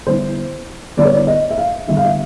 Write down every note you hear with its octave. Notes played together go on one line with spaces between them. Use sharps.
D3 G3 B3 E4 C5
D3 G3 B3 E4 D5
C#5
D5
D#5
E5
F5
D3 G3 B3 E4 E5
F5
E5